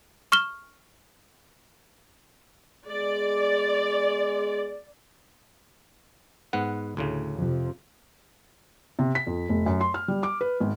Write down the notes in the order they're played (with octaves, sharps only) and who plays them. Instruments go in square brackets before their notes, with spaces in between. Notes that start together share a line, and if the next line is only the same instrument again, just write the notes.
[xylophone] C#6 F6 E7 G7
[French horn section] G#3 B3 G#4 [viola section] D5
[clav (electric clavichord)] G#2 B3 F#5
D2 A2 C#3
[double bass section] F2 C3 F3
[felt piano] C3
B6
F2
F1
F#2
C6
F6
G3
D6
B4
G#1